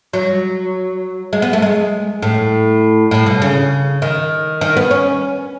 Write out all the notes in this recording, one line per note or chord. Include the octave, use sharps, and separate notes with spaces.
F#3
G#3
B3
A3
G#3
A2
A2
B2
C#3
D#3
D#3
B3
C#4